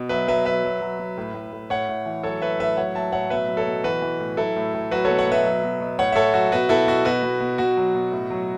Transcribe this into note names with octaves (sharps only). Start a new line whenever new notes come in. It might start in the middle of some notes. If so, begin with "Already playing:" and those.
Already playing: B2
F#3 B4 E5
F#3 B4 E5
F#3 B4 E5
F#3
F#3
F#3
A2
A2
A2
A2 C#5 F#5
A2
E3
F#3 A4 C#5
F#3 B4 E5
A2 B4 E5
F#3 C#5 F#5
F#3 E5 A5
A2 C#5 F#5
B2 B4 E5
F#3
A4 C#5
B2
E3 F#4 B4
E3
A2
F#3 E4 A4
A2
A2
F#3 F#4 B4
B2 A4 C#5
C#5 F#5
B2 B4 E5
F#3
B2
B2
A2 C#5 F#5
E5
A2 A4 C#5
F#3 F#4
B2 F#4 B4
B2 E4 A4
B2 F#4
B2 F#4 B4
B2
B2
B2 F#4
F#3
B2
A2
F#3